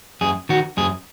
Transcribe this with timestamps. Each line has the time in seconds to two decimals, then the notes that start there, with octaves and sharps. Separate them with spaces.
0.21 F#2 G#4
0.49 D#3 F#4
0.77 F#2 G#4